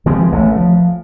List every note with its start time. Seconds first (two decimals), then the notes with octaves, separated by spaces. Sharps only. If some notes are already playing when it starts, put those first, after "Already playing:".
0.06 E3 F3 G#3 C4
0.32 A1 A3
0.56 F3